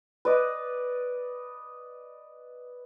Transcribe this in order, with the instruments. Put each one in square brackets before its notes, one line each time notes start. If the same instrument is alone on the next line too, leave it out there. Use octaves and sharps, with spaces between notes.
[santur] B4 D5 D#5